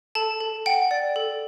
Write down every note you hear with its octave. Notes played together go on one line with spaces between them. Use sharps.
A4 A5
A4
F#5 G5
D5
A4